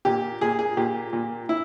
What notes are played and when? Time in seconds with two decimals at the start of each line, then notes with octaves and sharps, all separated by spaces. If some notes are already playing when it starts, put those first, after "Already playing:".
0.05 A#2 G4
0.41 A#2 G#4
0.59 G#4
0.77 A#2 G4
1.13 A#2
1.49 E4